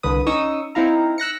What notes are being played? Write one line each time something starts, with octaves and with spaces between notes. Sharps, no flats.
C2 D3 B4 D#6
C#4 D#4 C#6 D#6 E6
C4 D#4 E4 F5 A#5
E6 F#6 A#6 C#7